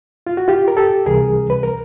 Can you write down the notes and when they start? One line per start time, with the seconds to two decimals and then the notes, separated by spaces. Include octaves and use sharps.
0.27 F4
0.37 F#4
0.48 F4 G4
0.68 A#4
0.77 G4 A4
1.06 C#2 C3 E3 G3 G#4 A#4
1.50 B4
1.63 A#4